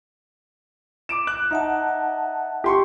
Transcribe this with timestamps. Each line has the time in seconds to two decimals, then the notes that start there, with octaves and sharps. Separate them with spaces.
1.09 D6 D7 E7
1.27 F#6
1.51 D#4 E5 F#5 A5
2.64 G4 C6 C#6